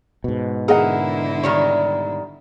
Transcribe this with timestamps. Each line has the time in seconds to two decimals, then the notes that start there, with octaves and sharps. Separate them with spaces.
0.24 G#2 B2
0.68 D3 E4 G#4 A#4 D#5 F#5
1.43 D#3 G3 C#5